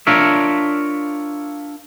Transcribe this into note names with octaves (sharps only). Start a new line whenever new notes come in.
D4 F4 A#4 C#5 E5